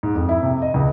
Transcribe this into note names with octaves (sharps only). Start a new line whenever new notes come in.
G#2
F2
E4
C3
D#5
C#2